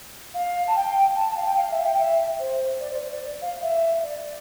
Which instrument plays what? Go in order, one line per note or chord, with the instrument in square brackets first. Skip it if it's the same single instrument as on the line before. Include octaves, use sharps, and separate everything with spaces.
[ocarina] F5
A5
G5
A5
A5
F5
G5
F5
E5
G5
E5
C5
D5
C5
C5
D5
F5
E5
D5